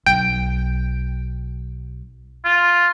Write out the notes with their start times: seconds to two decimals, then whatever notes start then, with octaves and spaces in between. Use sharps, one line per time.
0.06 B1 G5
2.45 F4